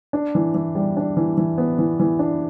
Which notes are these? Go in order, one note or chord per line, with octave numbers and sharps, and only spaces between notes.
D4
E3
E3
G3
D4
E3
E3
B3
E3
E3
D4